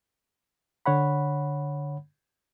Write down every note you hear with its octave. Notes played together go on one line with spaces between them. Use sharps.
D3 C#5 F#5 B5